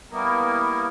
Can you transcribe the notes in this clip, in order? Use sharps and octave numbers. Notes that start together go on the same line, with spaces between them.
G3 A#3 B3 E4 A#4